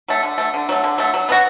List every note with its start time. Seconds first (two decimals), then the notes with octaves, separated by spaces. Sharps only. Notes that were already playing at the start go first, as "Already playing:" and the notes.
0.08 F#3 A3
0.23 D3
0.38 F#3 A3
0.54 D3
0.69 F#3 A3
0.84 D3
0.98 F#3 A3
1.14 F#3
1.29 B3 D4 F#4